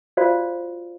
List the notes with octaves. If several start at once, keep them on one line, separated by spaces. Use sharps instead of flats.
F4 F#4 C5 D5 F5